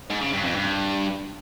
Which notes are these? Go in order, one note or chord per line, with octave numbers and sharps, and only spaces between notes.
G#2
C#3
G2
F2
G2